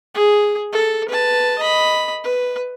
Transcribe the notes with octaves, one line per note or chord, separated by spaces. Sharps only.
G#4
A4
B4 A5
D#5 B5
B4